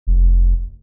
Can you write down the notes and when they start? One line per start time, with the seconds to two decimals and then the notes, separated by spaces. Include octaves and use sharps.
0.07 F1